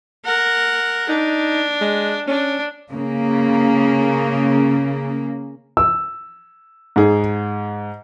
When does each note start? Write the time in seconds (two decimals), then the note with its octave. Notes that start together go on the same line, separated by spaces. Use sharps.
0.25 A#4 F#5
1.09 D4 D#4
1.81 G#3
2.28 C#4 D4
2.91 C#3 A#3
5.77 E6
6.96 G#2 G#4